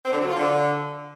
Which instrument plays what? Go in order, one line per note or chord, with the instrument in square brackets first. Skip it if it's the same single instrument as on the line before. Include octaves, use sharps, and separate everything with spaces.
[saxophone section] C4
D3
F#3
F4
D3